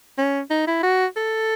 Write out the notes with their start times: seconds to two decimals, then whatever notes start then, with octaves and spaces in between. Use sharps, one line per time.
0.18 C#4
0.51 D#4
0.67 E4
0.83 F#4
1.16 A4